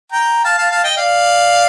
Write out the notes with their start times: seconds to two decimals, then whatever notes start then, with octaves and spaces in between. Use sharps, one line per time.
0.12 G5 A#5
0.44 F5 A5
0.58 F5 A5
0.71 F5 A5
0.84 D#5 G5
0.97 D5 F5